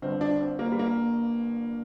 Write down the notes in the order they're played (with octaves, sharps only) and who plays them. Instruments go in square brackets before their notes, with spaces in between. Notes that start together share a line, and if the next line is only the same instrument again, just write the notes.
[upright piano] G1 G2 D3 C4
D4
C4
A#3
G3
A#3